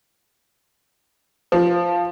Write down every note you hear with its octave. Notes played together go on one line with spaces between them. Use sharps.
F3